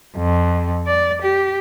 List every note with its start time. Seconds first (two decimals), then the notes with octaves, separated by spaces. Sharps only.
0.17 F2
0.87 D5
1.23 G4